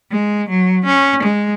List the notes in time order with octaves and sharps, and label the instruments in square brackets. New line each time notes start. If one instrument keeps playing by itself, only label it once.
[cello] G#3
F#3
C#4
G#3